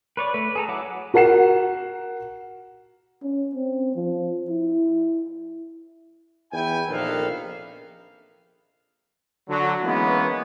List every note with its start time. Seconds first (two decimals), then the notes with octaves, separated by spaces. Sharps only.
0.17 B4 C#5 D5
0.34 A3 B4
0.55 G#4 A4 A#5
0.68 F#3 E4 C#5 F#5 D6
1.14 F#4 A#4 F#5 C7 E7
3.23 C#4
3.54 C4
3.95 F3
4.50 E4
6.51 E2 E4 G5 G#5
6.88 A#1 C3 D#3 A4 B4 F5
9.48 D3 F#3
9.82 E3 G#3 A#3 B3 C#4